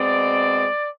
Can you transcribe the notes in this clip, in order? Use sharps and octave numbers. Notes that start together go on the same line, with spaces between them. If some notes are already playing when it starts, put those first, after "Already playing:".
Already playing: B2 G#3 C4 D5